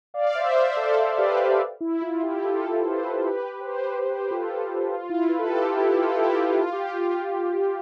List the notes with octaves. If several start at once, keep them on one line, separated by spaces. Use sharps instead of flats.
D5 F5
C5 E5
C5 E5
A4 C5
C5
G4 B4
E4
F4
E4 G4
F4 A4
C5
G4 B4
G4 B4
C5
G4 B4
C5
G4 B4
F4 A4
F4
F4
E4
F4
B4
A4
G4
F4
E4 G4
F4 A4
E4 G4
F4
F4
G4
F4
F4